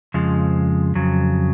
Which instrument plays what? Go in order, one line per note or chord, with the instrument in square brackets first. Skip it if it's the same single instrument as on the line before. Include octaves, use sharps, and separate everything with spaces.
[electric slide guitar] F2 C#3 F3 G#3
F2 C#3 F#3